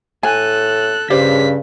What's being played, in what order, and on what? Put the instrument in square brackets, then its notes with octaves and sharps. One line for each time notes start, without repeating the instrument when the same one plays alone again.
[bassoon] A2 [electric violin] A4 F#6 [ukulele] G#5
[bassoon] G2 [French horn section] C#3 [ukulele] G4 C5 D5 [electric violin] B6